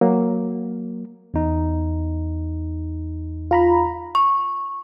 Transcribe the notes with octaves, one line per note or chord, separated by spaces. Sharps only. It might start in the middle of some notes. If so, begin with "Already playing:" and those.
F#3 A#3
E2 D#4
F4 A#5 B5
C#6